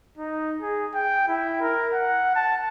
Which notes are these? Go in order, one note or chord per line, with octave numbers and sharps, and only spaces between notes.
D#4
G#4
G5
E4
A#4
F#5
A5